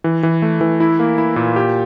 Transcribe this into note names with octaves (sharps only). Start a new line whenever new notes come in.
E3
E3
A3
E3
E4
A#3
E4
A#2
G4